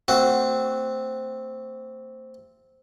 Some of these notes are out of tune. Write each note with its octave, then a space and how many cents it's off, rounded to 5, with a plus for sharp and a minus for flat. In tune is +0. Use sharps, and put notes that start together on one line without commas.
A3 +45 C4 +0 F#4 +5